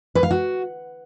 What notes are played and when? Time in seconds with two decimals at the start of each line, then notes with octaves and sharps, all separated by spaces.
0.15 B4
0.23 F5
0.31 F#4